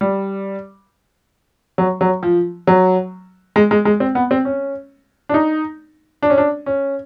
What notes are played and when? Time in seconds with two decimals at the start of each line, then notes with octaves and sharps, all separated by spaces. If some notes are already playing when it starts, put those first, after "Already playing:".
0.01 G3
1.78 F#3
2.01 F#3
2.23 F3
2.67 F#3
3.56 G#3
3.71 G#3
3.85 G#3
4.00 C4
4.15 B3
4.31 C4
4.45 C#4
5.29 D4
5.34 D#4
6.23 D4
6.30 C#4
6.38 D4
6.66 C#4